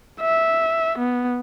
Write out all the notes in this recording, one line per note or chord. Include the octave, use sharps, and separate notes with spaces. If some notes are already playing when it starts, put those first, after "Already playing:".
E5
B3